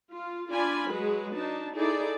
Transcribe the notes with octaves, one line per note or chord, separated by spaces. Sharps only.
F4
D4 F4 D5 G#5 B5
F#3 G#3 G#4 B4
D4 D#4 A5
D#4 E4 G#4 A4 D5